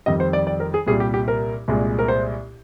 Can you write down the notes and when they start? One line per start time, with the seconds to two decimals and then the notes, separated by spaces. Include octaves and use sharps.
0.06 F2 D#3 G3 D#5
0.20 C5
0.33 D5
0.47 D5
0.60 A#4
0.74 G#4
0.87 C2 A#2 G3 G#4
1.00 G4
1.14 G4
1.28 A#4
1.68 C2 A#2 G#3
1.99 A#4
2.08 C5